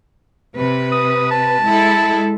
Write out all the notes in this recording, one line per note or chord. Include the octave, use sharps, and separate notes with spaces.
C3 B4
D#6
A5
G#3 E4 A4